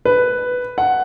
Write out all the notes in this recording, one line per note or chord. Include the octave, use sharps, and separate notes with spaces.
B4
F#5